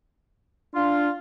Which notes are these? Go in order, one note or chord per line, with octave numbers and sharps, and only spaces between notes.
D4 F4